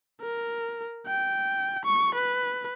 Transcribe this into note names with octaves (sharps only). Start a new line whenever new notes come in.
A#4
G5
C#6
B4